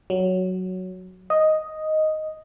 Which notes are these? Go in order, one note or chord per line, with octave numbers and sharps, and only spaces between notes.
F#3
D#5